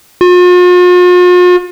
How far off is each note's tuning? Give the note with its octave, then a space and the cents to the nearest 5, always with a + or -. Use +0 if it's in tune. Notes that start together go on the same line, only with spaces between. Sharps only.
F4 +45